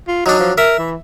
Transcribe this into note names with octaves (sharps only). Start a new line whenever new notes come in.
F4
F#3 D4 D#4
F3
A#4 E5
E3